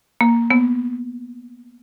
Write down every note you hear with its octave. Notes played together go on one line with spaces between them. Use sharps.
A#3
B3